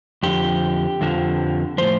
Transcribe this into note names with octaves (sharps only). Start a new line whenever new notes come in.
F2 D3 F3 G4
F2 D3 F3
A2 F3 C5